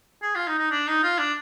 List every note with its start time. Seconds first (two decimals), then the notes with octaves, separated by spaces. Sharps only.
0.22 G#4
0.35 F4
0.47 D#4
0.59 D#4
0.71 D4
0.88 D#4
1.03 F4
1.19 D4